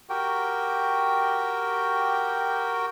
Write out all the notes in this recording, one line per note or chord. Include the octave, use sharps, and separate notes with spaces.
F#4 G4 A#4 G5